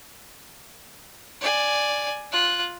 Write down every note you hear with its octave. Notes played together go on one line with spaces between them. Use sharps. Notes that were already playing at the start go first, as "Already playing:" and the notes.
D5 G#5
F4 F#6